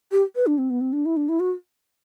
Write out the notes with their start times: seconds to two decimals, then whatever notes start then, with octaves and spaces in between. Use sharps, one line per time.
0.12 G4
0.36 B4
0.47 D4
0.58 C4
0.70 B3
0.81 C4
0.93 D4
1.06 E4
1.17 D4
1.29 E4
1.40 F#4